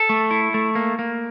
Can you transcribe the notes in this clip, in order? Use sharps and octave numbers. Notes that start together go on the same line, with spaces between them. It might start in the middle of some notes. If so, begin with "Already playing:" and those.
Already playing: A4
A3
E4
A3
A#3
A#3